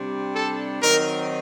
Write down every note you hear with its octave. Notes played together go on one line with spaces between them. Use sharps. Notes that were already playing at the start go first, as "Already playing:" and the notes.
Already playing: C3 G3 D4
A4
D#3 F#3 C4 D#4 A#4